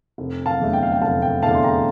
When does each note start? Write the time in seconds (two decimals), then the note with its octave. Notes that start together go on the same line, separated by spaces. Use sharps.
0.18 F1
0.46 F5 A5
0.60 E2 D3 A3 E4
0.73 G5
0.83 F5
0.92 G5
1.01 F1 F5 A5
1.22 G5
1.43 E2 D3 A3 E4 F5 A5
1.55 C6
1.64 G5 A#5